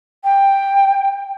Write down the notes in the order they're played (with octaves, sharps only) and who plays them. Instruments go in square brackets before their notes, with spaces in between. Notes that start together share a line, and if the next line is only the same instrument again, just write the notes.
[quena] G5